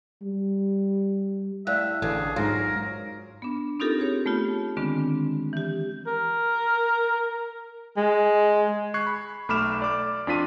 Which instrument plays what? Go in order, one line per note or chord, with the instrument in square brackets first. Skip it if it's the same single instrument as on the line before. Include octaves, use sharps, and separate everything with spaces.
[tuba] G3
[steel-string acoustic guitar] A2 [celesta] D5 F5 F#6 [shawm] E5
[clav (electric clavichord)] A1 [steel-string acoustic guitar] D3 [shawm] G#4
[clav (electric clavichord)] G#2 F4 [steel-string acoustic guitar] F#3 [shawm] A#4
[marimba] B3 D4
C4 D#4 F4 G4 A4 A#4
G4 G#4 C#5
A3 B3 F4 G4
D3 D#3 G#3 B3 C4 D4
E3 G4
[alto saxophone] A#4
G#3
[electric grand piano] C#6 F#6 G#6 C7
B5
B1 A3 B5 D6 F6 E7
D5 D6
F2 D4 F4 B6 D#7